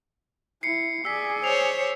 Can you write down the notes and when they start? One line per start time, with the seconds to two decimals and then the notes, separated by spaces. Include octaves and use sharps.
0.63 E4 C7 C#7
1.05 G#4 D5 E6 B6
1.44 C5 C#5 C7 F7